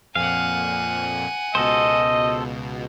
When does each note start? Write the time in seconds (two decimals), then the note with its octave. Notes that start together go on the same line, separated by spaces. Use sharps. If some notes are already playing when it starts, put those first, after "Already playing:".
0.15 F2 A#2 F5 F#5 G#5
1.55 C#2 B2 A4 C5 D#5